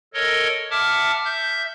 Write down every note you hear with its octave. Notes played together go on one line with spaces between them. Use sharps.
A4 A#4 C#5 D#5
E5 F#5 A5 D6 F6
E5 G6